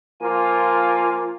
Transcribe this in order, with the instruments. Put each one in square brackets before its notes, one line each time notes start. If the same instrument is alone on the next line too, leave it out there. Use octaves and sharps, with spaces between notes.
[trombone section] F3 A#3 F4 [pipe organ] G#5